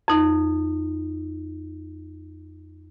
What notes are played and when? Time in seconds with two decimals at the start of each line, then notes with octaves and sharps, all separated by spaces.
0.08 F2 D#4